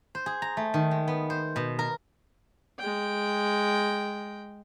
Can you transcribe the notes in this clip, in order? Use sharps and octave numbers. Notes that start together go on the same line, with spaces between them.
C5
G#4
A#5
A3
D#3
G#3
B3
C5
B2
A#4
G#3 G5